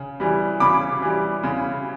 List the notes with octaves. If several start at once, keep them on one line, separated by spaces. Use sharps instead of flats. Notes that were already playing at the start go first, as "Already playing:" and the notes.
Already playing: C#3
E3 G3
C#3 B5 D6
E3 G3
C#3